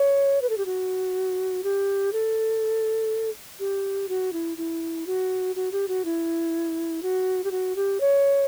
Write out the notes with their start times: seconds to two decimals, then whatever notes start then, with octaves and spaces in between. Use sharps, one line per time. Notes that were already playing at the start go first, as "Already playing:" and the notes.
Already playing: C#5
0.42 B4
0.50 A4
0.58 G4
0.66 F#4
1.64 G4
2.13 A4
3.60 G4
4.09 F#4
4.33 E4
4.58 E4
5.07 F#4
5.56 F#4
5.72 G4
5.88 F#4
6.05 E4
7.03 F#4
7.44 G4
7.51 F#4
7.76 G4
8.01 C#5